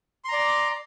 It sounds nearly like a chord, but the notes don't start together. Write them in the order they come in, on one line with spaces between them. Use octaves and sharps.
C6 A#5 D5